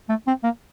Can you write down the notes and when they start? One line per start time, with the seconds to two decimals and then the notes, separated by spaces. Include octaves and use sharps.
0.09 A3
0.27 C4
0.44 A#3